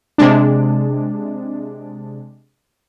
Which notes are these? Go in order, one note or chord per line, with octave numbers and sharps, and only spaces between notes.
C3 G#3 D4